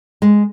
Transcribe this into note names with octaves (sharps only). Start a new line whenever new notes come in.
G#3